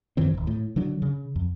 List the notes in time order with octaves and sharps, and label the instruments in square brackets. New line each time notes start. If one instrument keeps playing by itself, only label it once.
[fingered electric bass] F#2 D#3 E3 C4
D#1 A#1
A2
D3 F#3 D4
C#3
F2